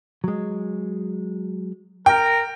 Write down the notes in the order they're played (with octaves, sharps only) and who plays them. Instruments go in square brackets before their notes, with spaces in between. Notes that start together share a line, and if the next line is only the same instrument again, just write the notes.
[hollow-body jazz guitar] F#3 G#3
[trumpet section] A#4 [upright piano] G5